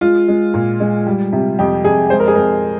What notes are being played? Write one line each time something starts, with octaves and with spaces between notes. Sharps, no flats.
G#3 F4
G#3
A#2
G#3
G3
C3
F2 G4
F2 G#4
G#3 C5
A#4
G#4
F2 A#4